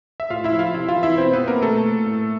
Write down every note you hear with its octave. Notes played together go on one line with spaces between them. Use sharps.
E5
A2 F4 F5
E4 E5
F3
F4 F5
C3 E4 E5
F4 F5
E3
E4 E5
B2 C4 C5
B3 B4
A#3 A#4
B2 A3 A4
A2